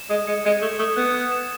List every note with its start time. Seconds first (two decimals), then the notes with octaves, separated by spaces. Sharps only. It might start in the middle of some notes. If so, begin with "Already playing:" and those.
Already playing: E7
0.10 G#3 D#6
0.27 G#3 C#7
0.45 G#3 G#6
0.62 A3 E7
0.79 A3 D#6
0.96 B3 F#6
1.14 F#6
1.32 E7